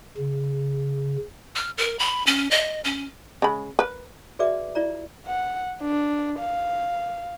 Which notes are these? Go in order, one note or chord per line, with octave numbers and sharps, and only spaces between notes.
C#3
F6
A#4
B5
C#4
D#5
C#4
C#3 G#3 B5
A#4 B4
F#4 G#4 B4 D5 E5 D6
E4 F4 D5 A#5
F#5
D4
F5